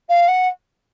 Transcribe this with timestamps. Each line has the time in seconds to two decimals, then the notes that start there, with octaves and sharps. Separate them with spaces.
0.09 F5
0.28 F#5